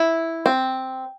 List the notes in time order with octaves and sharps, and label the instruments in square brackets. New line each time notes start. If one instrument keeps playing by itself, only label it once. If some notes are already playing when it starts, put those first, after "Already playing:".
Already playing: [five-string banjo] E4
C4